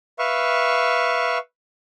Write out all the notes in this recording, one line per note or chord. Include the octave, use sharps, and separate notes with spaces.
B4 E5 F5 C#6